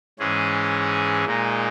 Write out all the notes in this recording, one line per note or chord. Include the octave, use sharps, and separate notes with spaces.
G#2 E3 G#3 C#4 G#4
A#2 G#3 D#4